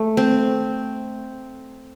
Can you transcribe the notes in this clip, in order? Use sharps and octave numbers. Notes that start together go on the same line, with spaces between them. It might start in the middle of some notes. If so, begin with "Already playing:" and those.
Already playing: A3
C4